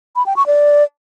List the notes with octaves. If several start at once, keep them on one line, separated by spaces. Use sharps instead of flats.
B5
G5
C#6
D5